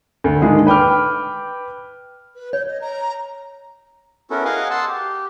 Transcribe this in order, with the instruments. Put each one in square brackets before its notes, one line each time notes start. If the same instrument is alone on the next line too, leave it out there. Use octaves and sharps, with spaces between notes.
[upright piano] D2
D3 D#3 G#3 A#3 G#4
B4 G5 D6 F6
[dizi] B4
[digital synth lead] C#5 [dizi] G6
[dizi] D#5
A#5
[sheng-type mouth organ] B3 C#4 E4 F#4 A4 A#4
G#4 A#4 D#5 F5 F#5 G#5
F#5 A5 C6 E6
G4